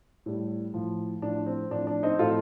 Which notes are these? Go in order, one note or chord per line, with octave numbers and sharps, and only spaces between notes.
A2 G3
A2 F3
A2 F3 D4
C4
A2 F3 D4
D4
C4 D#4
A2 F3 F4 A4